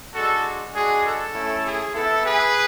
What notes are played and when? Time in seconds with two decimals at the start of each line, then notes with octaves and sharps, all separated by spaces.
0.14 G#3 D4 F#4 A4
0.74 G#3 D4 F#4 G#4
1.04 A4
1.34 A3 C#4 E4
1.65 G#4
1.94 B3 E4 A4
2.24 G#4 B4